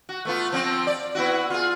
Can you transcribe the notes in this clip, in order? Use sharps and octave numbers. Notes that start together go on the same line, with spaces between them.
F#4
A3 B3 F4
F3 C4
D5
B3 E4 F#4
F4 G#4